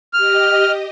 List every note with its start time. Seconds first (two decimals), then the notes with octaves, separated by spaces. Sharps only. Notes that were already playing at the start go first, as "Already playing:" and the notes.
0.13 G4 D#5 F6